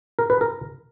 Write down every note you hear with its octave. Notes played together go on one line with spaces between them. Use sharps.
A#4
B4
A#4